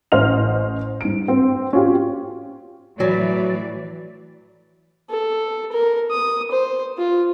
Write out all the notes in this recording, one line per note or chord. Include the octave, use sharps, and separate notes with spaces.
A1 C#4 C5 D#5 F6 F7
G2 D7
C4
C#4 F4 G4
A2 E3 F#3 D5
A4
A#4
D#6
C5
F4